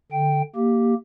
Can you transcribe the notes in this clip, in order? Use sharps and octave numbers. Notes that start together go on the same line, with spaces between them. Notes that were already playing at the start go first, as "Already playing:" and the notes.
D3 G5
A#3 G4